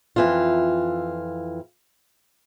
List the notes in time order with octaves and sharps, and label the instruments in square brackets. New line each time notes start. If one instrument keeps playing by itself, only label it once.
[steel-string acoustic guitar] F2 E3 F4